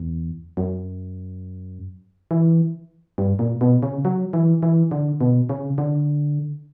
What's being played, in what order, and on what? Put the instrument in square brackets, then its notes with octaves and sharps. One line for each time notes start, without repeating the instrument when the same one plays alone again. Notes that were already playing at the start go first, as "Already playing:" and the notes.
Already playing: [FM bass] E2
F#2
E3
G2
A#2
B2
C#3
F#3
E3
E3
D3
B2
C#3
D3